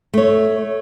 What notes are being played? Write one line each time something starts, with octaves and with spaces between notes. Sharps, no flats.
A3 C#5